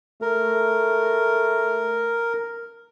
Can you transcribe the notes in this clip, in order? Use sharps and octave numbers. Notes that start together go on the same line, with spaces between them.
A3 A#4